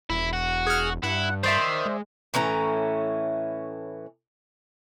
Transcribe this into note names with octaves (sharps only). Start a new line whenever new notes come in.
E1 E4
F#4
G#4 F#5 F6
G2 E4 F#5
D#3 C5 D5 E5
G#3
A2 E3 C#4 A#5